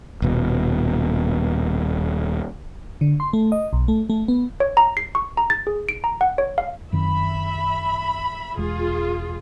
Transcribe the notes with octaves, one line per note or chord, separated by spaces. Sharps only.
D#1 B2
D3
C6
A3
D#5
B1
A3
A3
B3
C#5
A#5
C7
C#6
A#5
A6
G#4
D7
A#5
F#5
C#5
F5
F#2 D#3 C4 E5 B5
E1 G#3 F4 G#4